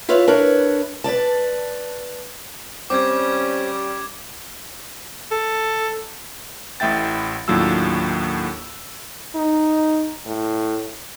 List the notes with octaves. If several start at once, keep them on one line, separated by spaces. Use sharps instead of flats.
E4 F4 B4 C#5 E5 F5
D4 E4 A#4 B4 C#5
B4 C#5 D5 A5
G3 C4 C#4 D6 G#6
A4
A1 A2 E5 G5 A6
D#2 A2 F#3 D4 F4 E6
D#4
A2